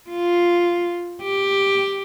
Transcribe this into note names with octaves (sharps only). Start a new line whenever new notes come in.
F4
G4